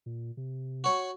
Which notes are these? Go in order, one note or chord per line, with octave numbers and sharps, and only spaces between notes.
A#2
C3
F#4 C#5